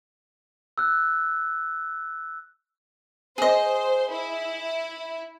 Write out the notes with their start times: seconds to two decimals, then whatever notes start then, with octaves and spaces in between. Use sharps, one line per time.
0.78 E6 F#6
3.38 G#4 C5 D#5
4.11 E4